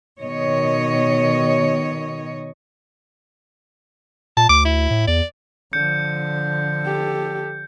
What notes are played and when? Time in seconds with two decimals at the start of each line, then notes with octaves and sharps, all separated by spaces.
0.20 B2 D#3 C#5 D#5
4.37 A#2 A5
4.49 D2 D6
4.65 E4
4.90 A2
5.07 E2 D5
5.73 D3 F3 G6 C#7
6.83 G4 A4